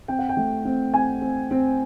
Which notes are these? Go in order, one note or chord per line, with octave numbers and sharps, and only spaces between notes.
C4 G5
F#5
G5
A3
C4
C4 G#5
C4
C4